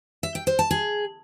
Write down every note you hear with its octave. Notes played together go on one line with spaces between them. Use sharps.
E5
G5
C5
A5
G#4